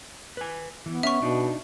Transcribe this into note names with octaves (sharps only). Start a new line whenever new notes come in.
B4 G#5
E3 B3
C#4 E5 C#6
B2 D4 D#4